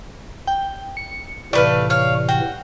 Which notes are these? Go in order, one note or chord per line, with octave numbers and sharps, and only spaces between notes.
G5
C#7
A2 C3 E3 A3 B4 D5 F5
C#5 F5
F#4 G5